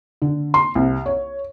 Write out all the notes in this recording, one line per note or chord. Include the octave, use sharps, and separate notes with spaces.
D3
C6
C2
C#5